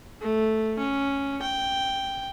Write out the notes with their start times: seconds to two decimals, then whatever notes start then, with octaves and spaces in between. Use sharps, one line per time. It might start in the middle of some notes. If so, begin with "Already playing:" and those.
0.21 A3
0.78 C#4
1.42 G5